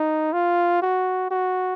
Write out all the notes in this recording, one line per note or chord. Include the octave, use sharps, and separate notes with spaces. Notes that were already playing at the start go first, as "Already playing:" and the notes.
Already playing: D#4
F4
F#4
F#4